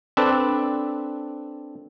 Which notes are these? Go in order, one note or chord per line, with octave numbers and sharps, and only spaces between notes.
C4 D4 A4 B4